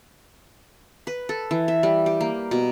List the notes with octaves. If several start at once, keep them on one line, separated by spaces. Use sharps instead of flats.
B4
A4
E3
E5
G3
G4
A#3
B2